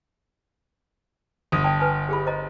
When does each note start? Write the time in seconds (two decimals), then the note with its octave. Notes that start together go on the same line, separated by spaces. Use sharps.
1.52 G1 D#6
1.64 D5 G5 A5
1.80 B4 G#5 A5
2.09 G4 G#4 B5
2.26 C5 D#5 A#5